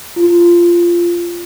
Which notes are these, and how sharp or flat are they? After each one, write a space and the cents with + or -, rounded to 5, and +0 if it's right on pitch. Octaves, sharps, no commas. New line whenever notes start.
F4 -15